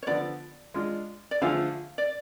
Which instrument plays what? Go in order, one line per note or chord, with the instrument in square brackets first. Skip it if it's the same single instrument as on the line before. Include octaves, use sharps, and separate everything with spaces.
[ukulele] C#5
[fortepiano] D3 F3 B3 [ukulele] D5
[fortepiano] G#3 D4 F4
[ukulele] D5
[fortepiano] D3 F3 A3 F4 G#4 [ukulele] F5
[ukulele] D5